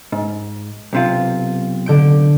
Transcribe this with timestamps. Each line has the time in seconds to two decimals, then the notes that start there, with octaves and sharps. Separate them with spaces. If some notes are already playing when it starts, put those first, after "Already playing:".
0.12 G#2
0.93 B1 C3 F4
1.86 D3 G6 D7